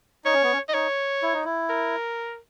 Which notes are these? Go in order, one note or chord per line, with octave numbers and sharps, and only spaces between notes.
D#4 C#5
C#4
B3
C#4
D#5
D#4 C#5
E4
D#4
E4
A#4